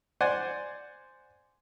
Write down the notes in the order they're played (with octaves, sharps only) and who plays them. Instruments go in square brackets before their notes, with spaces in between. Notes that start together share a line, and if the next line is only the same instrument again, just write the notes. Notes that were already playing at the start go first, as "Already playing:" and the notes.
[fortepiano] C5 D5 F#5 G#5